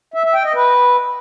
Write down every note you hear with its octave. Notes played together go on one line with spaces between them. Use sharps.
E5
E5
G5
D#5
B4